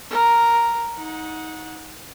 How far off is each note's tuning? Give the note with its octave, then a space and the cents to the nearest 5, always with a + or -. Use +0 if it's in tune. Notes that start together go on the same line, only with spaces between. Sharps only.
A#4 +0 A#5 +0
D#4 +20 F#5 -20